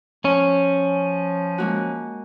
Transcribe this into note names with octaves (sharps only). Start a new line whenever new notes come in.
F3 C#4
G#3 A#3 F#4